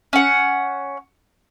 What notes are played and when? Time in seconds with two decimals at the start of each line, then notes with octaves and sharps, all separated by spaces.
0.13 C#4 F#5